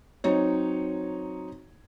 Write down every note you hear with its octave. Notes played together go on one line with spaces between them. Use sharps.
F#3 C4 D#4 C#5